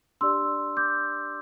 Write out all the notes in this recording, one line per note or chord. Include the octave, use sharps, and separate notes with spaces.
D4 G4 D5 C6 E6
D6 G6